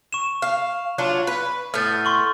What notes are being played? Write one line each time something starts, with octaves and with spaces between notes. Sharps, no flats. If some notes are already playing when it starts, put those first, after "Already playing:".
C#6 E7
F5
F#3 D4 F4
B4
A2 B3 F6 G6 A6
C6 C#6 F#7